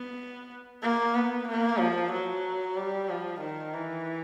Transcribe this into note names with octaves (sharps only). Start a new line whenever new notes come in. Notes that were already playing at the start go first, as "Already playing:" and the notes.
Already playing: B3
A#3
B3
A#3
F3
F#3
G3
F3
D#3
E3